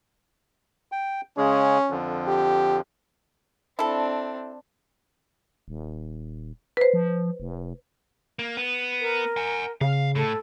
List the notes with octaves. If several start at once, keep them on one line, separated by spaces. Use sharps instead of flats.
G5
C#3 G#3 C#4 G#4
F2 D3 F3
G4
C4 D4 E4 A4
D#1
B4 C5
F3
F1
A#3
B3
A#4
F#5 G#5
C#3 F5
A2 A4